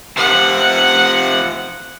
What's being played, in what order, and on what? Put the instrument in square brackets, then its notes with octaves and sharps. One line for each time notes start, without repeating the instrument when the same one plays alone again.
[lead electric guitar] C3 F3 [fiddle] F#5